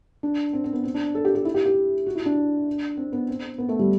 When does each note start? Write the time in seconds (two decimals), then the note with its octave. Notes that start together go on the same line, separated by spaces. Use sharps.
0.23 D4
0.53 C4
0.64 C4
0.73 B3
0.84 C4
0.94 D4
1.15 A4
1.25 G4
1.35 G4
1.45 E4
1.54 G4
1.65 G4
2.06 F#4
2.15 E4
2.26 D4
2.97 C4
3.12 B3
3.28 C4
3.58 B3
3.69 A3
3.79 G3